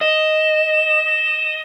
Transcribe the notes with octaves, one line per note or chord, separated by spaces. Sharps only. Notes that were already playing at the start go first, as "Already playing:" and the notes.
D#5 E7